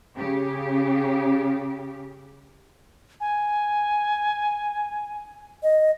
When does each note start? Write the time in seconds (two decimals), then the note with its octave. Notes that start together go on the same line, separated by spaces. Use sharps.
0.15 C#3 G4
3.20 G#5
5.63 D#5